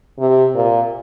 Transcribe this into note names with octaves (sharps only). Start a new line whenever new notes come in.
C3
A#2